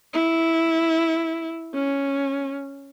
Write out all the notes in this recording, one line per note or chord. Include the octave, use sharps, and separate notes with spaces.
E4
C#4